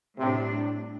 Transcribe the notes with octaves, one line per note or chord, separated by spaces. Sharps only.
A2 C3 G3 D4